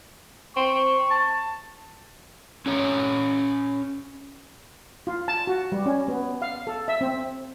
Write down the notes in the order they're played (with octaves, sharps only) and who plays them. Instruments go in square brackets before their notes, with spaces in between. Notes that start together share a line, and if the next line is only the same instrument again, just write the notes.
[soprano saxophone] C4 [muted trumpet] C#6
[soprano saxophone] A5
[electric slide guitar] C#4 A4 C#5 A#5
[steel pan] F4
A5
F#4
G3
C#4
B3
F5
A4
E5
C4